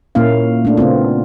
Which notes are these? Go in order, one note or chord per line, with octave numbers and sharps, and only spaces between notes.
A#2 A#3 C#4 E4 F5
A3 D4
C#3 B3 C4 F4